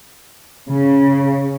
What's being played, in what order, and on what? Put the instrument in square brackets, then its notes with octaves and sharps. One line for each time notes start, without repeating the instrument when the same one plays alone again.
[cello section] C#3